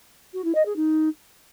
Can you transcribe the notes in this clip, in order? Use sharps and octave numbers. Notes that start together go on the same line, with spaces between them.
F#4
E4
D#5
G#4
D#4